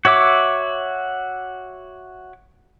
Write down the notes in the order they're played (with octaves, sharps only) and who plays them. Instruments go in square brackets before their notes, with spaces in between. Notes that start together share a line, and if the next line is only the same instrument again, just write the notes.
[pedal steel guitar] F#4 C#5 E5 D6